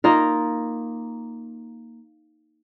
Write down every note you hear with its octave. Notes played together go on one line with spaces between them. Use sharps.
A#3 D#4 F4 A#4